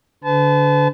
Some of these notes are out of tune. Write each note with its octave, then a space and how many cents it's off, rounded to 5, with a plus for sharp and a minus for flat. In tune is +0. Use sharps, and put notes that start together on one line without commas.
D3 -25 B4 +40 A5 -30